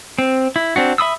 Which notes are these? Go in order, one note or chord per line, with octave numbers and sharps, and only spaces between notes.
C4
E4
C4 D4 F#4
E5 B5 D#6 E6